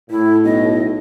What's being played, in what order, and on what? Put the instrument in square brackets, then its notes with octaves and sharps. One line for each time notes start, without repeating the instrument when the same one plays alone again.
[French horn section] A2 [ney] E4
[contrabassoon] B1 [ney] D#5